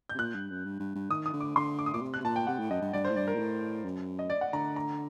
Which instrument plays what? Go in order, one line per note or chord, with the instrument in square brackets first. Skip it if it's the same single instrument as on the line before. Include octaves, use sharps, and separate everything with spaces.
[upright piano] G6
[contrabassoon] C3
[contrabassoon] A#2 [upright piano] F#6
[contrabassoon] G2
F#2
G2
G2
G2
[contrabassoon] D#3 [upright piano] D#6
[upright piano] D#6
[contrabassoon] D3
[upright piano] D6
[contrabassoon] D3 [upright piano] C6
[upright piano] D6
D#6
[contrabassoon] A#2 [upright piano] D6
[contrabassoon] C3
[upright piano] F#6
[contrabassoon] C3
[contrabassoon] A#2 [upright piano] A5
[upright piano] G5
[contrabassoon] C3 [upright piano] F#5
[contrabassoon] A2
[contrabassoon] F#2 [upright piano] D#5
[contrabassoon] G2
[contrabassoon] G2 [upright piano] D5
[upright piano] C5
[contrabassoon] A2
[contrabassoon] G2 [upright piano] D5
[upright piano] A#4
[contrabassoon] A#2
A2
F#2
[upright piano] D#5
D5
F#5
[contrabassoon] D3 [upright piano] A#5
[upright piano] A#5